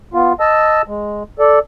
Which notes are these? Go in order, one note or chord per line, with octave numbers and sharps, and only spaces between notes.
B3 F4
D#5 A5 E6
G#3
A4 D5